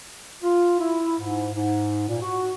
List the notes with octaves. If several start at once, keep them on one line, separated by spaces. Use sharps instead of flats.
F4
E4
G#2
G#2
A#2
F#4